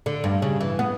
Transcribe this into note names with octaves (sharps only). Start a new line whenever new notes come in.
D3
G2
C#3
E3
B3